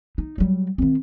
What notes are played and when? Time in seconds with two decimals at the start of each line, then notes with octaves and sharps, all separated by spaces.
0.18 D#4
0.38 F#3 G3
0.78 D#3 C4